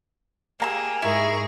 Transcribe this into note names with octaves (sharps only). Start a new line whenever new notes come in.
A#3 G4 G#4 A#5 E6
G#2 E4 G#4 A#4 C#6